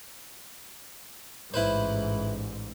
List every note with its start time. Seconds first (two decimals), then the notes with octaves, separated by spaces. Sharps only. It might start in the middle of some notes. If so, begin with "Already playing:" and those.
1.54 A1 G#2 E4 B4 C5